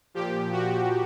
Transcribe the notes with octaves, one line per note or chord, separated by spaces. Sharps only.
A#2 F3 G4
F#4